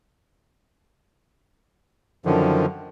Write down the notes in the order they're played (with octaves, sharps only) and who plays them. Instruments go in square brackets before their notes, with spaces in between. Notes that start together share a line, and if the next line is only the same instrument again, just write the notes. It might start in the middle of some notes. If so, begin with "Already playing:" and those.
[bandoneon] F#2 D3 D#3 F3